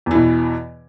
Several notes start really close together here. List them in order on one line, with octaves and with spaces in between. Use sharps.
E2 E3 B2